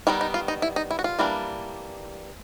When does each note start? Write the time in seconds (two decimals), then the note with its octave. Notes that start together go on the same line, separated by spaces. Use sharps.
0.07 D#3 G3 B3 D#4 E4
0.21 D#4
0.34 F4
0.48 D#4
0.62 E4
0.76 D#4
0.91 E4
0.99 F#4
1.04 F4
1.19 E3 G3 A#3 D4